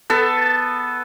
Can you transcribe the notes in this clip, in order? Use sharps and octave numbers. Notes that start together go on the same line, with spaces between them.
B3 A4